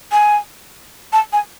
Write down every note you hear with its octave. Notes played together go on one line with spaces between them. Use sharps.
G#5
A5
G#5